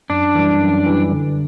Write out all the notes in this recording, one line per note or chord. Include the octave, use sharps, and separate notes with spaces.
F#2 D4
E3 G3
F#2
E3 G3
D3